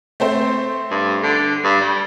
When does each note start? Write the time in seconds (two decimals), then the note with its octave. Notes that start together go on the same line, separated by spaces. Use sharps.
0.20 A3 C4 C5
0.91 G2
1.23 D3
1.64 G2
1.81 G3